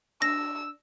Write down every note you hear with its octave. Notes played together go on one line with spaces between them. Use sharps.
D4 E6 A#6